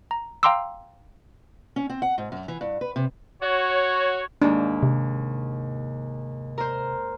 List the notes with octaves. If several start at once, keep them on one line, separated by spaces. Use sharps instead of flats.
A#5
F5 G5 A#5 C6 D6 E6
C#4
C4
F#5
G#2
F#2
E3
G2
B4
C3
F#4 C#5
D#2 G#2 D4
C3
A#4 C5